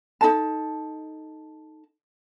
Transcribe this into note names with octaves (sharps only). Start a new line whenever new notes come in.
D#4 G#4 A4 A5